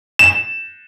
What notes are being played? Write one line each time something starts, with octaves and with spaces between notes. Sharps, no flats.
E7